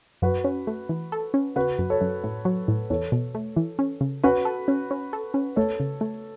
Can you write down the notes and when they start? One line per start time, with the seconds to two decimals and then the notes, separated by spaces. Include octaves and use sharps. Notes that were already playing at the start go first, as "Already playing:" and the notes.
0.22 F#2 F#4 B4
0.44 C#4
0.67 A3
0.89 E3
1.12 A4
1.34 C#4
1.56 C#3 F#4 B4
1.79 F#2
1.90 A4 C#5
2.01 F#2
2.24 A2
2.45 F#3
2.68 A2
2.90 E2 A4 C#5
3.12 B2
3.35 A3
3.56 E3
3.79 C#4
4.01 C#3
4.24 C#4 F#4 B4
4.45 A4
4.68 C#4
4.91 C#4
5.13 A4
5.34 C#4
5.56 A3 A4 C#5
5.80 C#3
6.01 A3